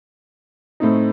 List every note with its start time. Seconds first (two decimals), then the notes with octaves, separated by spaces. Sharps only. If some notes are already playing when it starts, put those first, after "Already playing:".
0.80 A2 A3 C4 D#4